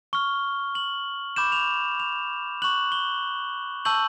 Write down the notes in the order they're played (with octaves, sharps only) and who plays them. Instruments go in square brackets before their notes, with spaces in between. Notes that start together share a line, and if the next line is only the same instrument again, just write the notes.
[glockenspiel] C#6 F6 G7
F#7
B5 D6 G6 E7
F7
F7
C#6 F#6 F#7
G7
A5 C#6 E6 G6 F#7